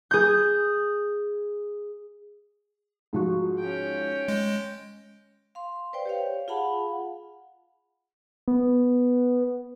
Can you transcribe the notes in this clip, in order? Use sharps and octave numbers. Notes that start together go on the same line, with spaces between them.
G#4 G6
G#2 F3 F#4
C#4 G5
G#3
F5 C6
B4 C5 D5 G5
G4 C#5 F5
F4 G#4 F5 F#5 A5 B5
B3